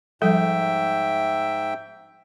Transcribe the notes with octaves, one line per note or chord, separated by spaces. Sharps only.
G#2 F3 G3 A4 E5 G5